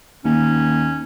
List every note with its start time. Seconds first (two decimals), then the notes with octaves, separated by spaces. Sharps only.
0.24 D#2 C#4